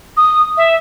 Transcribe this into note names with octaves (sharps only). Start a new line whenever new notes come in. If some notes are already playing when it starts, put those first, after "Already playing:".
D#6
E5